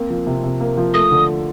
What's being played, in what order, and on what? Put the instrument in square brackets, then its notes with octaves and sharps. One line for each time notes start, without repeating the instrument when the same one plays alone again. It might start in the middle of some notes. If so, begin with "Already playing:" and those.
Already playing: [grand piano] A#3 C4
F3
C3
C3
A#3
F3
[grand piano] A3 [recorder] D#6
[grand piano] D3